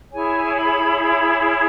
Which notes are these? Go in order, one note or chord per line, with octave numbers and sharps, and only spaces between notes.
E4 G#4 C#5 G#5
B5
B5
F6